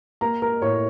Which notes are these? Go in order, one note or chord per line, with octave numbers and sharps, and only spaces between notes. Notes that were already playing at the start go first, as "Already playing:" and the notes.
A#3 A#4 A#5
A#4 A#5
A2 C#5 C#6